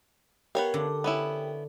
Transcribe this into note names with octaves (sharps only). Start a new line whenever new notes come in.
B3 G4 A#4 C#5 F5 G5
D3
B3 C#4 E4